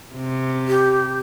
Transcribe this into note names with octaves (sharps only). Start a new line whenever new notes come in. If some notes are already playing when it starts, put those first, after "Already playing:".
C3
G4